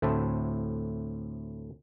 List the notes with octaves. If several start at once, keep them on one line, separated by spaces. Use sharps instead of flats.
D2 A2 C4 E4 E5 A5